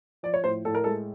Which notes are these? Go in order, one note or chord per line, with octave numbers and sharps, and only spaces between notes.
F3 D5
C#5
A2 C5
A2 A4
A#4
G#3 A4